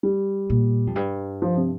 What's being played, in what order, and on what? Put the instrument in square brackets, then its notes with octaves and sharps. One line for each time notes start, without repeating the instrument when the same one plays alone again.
[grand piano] G3
[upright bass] A#2
F2
G2
[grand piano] F3
C3